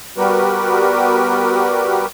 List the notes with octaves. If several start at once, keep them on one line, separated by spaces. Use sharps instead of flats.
G3 B3 F#4 G4 A#4 B4